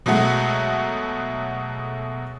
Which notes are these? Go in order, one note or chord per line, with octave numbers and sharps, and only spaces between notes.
B2 F#3 G#3 A3 F#4